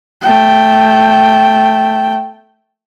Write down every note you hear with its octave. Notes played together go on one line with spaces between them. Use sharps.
A3 G5